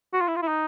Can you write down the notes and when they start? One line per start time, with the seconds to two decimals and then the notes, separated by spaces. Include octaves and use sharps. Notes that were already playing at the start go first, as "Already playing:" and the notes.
0.13 F#4
0.21 F4
0.28 E4
0.36 F4
0.42 E4
0.48 D#4